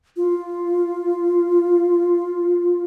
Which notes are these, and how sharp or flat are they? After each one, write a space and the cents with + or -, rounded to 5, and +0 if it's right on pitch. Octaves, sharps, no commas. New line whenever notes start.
F4 +0